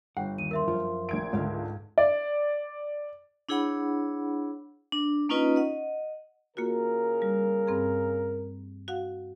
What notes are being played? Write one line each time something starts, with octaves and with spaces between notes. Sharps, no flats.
G1 F#5 G5
D#2 D#7
A#4 E5 C6
F#2 F3 F4
A#1 G#6 D7
C#2 G#2 D3 F5
D5
D4 E4 G#4 C#5 F#5 B5
D4
A#3 C#4 D#4 F4 B4 D#5
D#5 F#5
C#3 A#3 F4 F#4 A#4
G3
G2 C4 G#4
F#4 F5 F#5